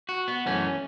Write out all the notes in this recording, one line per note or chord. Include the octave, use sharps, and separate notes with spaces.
F#4
B3
F#2 E3 A3 C#4